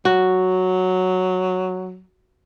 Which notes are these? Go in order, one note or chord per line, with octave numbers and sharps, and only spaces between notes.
F#3 F#4